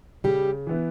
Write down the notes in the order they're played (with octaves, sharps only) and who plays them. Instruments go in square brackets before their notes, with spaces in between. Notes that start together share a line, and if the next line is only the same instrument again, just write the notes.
[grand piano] C#3 [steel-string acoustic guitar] G3 G4
[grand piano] E3 B3 E4